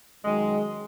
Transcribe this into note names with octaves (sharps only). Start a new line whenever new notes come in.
F#2 D#3 F#3 G#3